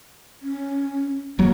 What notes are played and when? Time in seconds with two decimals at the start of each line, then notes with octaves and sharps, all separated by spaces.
0.42 C#4
1.39 D#1 F#3 A#3